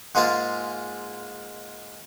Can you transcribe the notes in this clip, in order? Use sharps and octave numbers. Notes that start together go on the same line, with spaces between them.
G#2 G#3 A#3 F4 A5